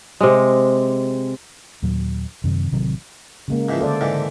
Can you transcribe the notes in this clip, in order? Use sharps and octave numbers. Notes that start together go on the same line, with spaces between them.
C3 G#3
D#2 A#2 F#3
F#2 C3 D#3
A1 C3 D#3 F#3
C#3 G#3 A#3
G#2 E3 F3
D2 A4 C5 D5
G#2 D3 E3